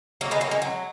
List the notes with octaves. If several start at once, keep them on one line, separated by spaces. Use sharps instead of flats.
F#3 A#3
G#3 B3
F#3 A#3
G#3
F#3